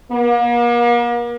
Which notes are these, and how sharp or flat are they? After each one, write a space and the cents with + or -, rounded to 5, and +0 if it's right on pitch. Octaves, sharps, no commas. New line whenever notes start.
A#3 +40